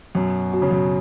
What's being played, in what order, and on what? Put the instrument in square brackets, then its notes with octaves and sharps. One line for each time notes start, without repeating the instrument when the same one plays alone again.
[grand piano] F#2 B2
B2
C#3
F#2 B2